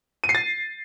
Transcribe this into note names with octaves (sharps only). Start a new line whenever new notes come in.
D#7
C7
A6